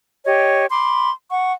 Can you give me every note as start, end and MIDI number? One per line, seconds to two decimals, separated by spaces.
0.25 0.66 67
0.25 0.66 73
0.25 0.66 75
0.70 1.10 83
0.70 1.10 84
0.70 1.10 86
1.30 1.52 78
1.30 1.52 85